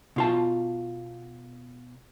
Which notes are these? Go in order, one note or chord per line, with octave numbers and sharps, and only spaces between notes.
B2 F4 A5